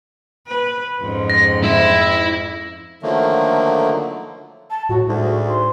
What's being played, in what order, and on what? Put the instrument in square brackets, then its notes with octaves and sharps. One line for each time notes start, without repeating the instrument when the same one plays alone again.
[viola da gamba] B4
F2 G#2 C#4
[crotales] A#6
[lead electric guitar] E4 E5
[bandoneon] D3 D#3 F3 F#3 A3 A#3
[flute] A5
[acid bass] A2 [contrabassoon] F#3 [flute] F#4
[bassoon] D2 [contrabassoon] G#2
[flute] C6